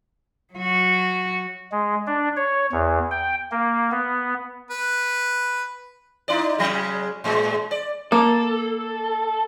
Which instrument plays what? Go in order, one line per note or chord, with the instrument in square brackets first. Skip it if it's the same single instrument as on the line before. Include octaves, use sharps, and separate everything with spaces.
[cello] F#3 F#4
[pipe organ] G#3
D4
C#5
E2
G5
A#3
B3
[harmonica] B4
[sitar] D#4 E4 D5
C#3 F#3 G#3
A2 G#3
D5
[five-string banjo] A#3 [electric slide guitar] A4